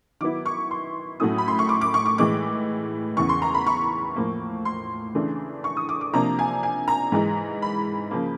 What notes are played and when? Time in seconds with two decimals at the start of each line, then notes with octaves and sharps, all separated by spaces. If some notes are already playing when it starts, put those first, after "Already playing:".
0.21 D#3 F#3 B3 E4 D6
0.46 C#6
0.71 C6
1.20 A2 F#3 A3 C#4 E4 D#6
1.38 B5
1.48 C6
1.59 C#6
1.69 D6
1.81 D6
1.94 C#6
2.06 D6
2.18 A2 E3 G#3 D6
3.17 E2 C#3 E3 C#6
3.29 C6
3.42 A#5
3.54 B5
3.66 C#6
4.16 A2 F3 A#3
4.65 C6
5.15 C#3 E3 A3 D4
5.64 C#6
5.77 D#6
5.89 D6
6.01 D6
6.13 C3 F3 A#3 D4 A#5
6.39 G#5
6.63 G#5
6.88 A#5
7.12 G#2 E3 G#3
7.62 B5
8.11 C#3 F3 A#3